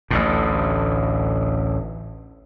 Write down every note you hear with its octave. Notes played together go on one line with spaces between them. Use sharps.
A1 D2 A2